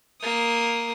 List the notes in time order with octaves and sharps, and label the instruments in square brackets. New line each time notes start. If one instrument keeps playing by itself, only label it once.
[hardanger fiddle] A#3 D#6